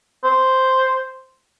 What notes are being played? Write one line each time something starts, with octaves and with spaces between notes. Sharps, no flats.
C5